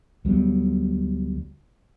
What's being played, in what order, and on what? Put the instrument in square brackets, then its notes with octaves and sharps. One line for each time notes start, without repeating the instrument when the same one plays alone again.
[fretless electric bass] D2 F#3 G3 B3